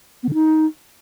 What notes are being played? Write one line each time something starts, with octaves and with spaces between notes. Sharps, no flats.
B3
D3
D#4